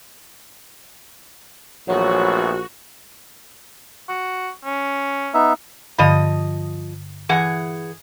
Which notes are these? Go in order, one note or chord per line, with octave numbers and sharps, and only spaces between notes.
A#1 E3 F#3 A3 B3 F#4
F#4
C#4
B3 D#4 E5
G2 D3 F3 D#5 B5
E3 G#4 F#5